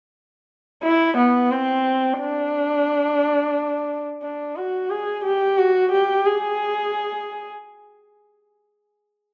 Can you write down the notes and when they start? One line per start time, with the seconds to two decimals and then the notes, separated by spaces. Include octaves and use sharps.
0.83 E4
1.17 B3
1.51 C4
2.19 D4
4.23 D4
4.56 F#4
4.90 G#4
5.24 G4
5.58 F#4
5.92 G4
6.26 G#4